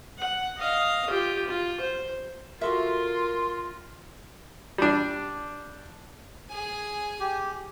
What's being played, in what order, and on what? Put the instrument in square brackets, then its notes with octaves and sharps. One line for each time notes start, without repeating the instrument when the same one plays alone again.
[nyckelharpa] F#5
D#5 F5
F4 G4
F4
C5
[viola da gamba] F4 [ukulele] F#4 A4 E5 [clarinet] A#4 [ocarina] C6
[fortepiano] G3 D4
[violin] G#4 G#5
[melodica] G4